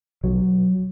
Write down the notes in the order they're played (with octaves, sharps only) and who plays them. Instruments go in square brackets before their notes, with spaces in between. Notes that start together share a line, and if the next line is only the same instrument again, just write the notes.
[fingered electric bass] B1 F#3